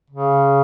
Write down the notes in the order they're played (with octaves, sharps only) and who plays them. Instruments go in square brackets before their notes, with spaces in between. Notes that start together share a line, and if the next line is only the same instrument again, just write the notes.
[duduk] C#3